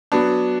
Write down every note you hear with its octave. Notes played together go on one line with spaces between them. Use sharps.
F#3 B3 D4